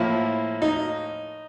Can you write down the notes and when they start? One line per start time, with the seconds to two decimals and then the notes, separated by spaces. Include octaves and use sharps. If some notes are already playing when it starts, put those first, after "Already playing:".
Already playing: A2 F3 A#3 E4
0.62 D#4